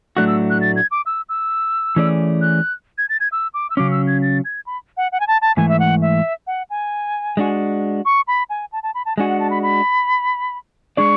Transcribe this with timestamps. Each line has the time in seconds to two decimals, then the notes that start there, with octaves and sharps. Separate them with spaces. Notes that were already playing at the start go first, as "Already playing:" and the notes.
0.17 A2 F#3 A3 D4 F#4 F#6
0.27 E6
0.50 F#6
0.61 A6
0.76 G#6
0.91 D6
1.06 E6
1.29 E6
1.96 E3 A3 C#4 G#4 D5
2.41 F#6
2.98 G#6
3.09 A6
3.20 G#6
3.32 E6
3.54 D6
3.70 E6
3.77 C#3 F#3 C#4 D6
3.91 E6
4.07 G#6
4.22 A6
4.45 G#6
4.66 B5
4.97 F#5
5.12 F#5
5.20 G#5
5.27 A5
5.41 A5
5.57 G#2 E3 A3 G#5
5.68 E5
5.79 F#5
6.01 E5
6.47 F#5
6.70 G#5
7.37 G#3 D4 F#4
8.05 C#6
8.27 B5
8.50 G#5
8.72 A5
8.83 A5
8.94 B5
9.05 A5
9.17 G#3 D4 F#4 G#5
9.29 F#5
9.40 A5
9.50 B5
9.63 B5
10.97 G#3 D4 G#4 D5 C#6